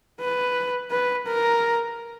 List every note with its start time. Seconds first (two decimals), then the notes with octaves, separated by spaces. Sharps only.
0.21 B4
0.91 B4
1.26 A#4